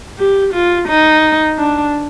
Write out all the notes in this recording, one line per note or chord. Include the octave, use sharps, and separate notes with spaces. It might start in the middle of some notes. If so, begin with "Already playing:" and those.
G4
F4
D#4
D4